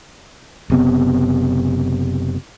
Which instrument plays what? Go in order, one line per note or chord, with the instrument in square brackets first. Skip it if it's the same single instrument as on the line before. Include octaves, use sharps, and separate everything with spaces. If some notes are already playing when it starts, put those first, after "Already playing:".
[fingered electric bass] F#1 C3 B3